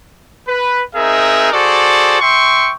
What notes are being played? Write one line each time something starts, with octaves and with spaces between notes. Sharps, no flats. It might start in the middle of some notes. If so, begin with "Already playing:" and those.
B4
C4 D#4 G#4 A#4 E5
F#4 G#4 A4 C5 D5
E5 G5 C6 C#6